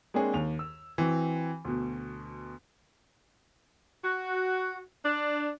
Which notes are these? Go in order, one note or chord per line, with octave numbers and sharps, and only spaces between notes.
G#3 A#3 C4 D4 G#4 C#5
D#2 F7
E6
E3 C4 F#4
D2 B2
F#4
D4